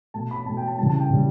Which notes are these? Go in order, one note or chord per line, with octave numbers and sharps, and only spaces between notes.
B2 A3 A5
B5
B2 A3 A5
G5
A5
C#3 E3 G3 A5
A5
G5
C#3 E3 G3